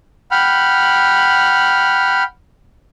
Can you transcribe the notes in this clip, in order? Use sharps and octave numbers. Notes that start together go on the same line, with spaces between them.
F#5 G5 B5 F6